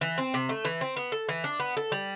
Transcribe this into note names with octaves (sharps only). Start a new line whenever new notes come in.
E3
C4
C3
A3
E3
C4
B3
A4
E3
D4
B3
A4
G3